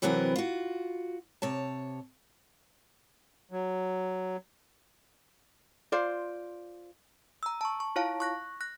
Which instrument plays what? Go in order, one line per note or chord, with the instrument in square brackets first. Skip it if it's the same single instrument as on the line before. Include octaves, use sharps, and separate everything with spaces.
[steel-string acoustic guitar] C3 E3 F#3 B3 C4 A#4
F4 F#4
C3 C#5 A5
[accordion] F#3
[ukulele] F4 C5 D5
[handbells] A#5 E6
A5 C#6
C#6
E4 F4 C#5 F5 A5
C#6 F#6 A#6
F#6 A#6